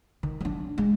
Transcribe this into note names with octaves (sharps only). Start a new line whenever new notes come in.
D#3
F#3 D4
G#3